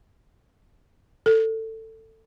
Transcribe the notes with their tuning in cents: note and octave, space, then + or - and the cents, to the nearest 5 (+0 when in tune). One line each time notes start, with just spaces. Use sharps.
A4 +20